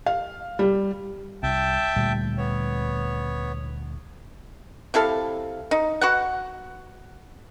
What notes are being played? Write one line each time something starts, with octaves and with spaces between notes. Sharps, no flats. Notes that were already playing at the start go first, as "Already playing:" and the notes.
F5
G3
C2 E5 G5 A5
D2 A#2 G3
B3 C#5
C3 E4 A4 F5
D#4
F#4 B4 F#5